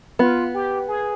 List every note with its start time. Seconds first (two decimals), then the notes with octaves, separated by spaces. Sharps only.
0.19 B3 F4
0.54 G4
0.88 G#4